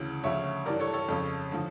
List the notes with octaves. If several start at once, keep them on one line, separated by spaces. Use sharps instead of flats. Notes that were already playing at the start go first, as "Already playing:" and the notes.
Already playing: D2 C#3 E3
D2 C#3 F3 C#5 E5
G2 E3 A#4 D5
A4 C#5
A4 C#5
F2 C#3 F3
D3 F3